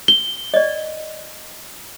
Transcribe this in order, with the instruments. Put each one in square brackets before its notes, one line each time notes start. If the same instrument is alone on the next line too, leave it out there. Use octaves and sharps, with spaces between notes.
[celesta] G7
[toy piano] D5 D#5